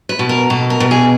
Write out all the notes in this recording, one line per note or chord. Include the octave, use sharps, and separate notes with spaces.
B4
B2
A#4
B2 A4
A#4
B2
G#4